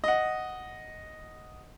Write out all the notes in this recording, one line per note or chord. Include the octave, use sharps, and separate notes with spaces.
D#5 F#5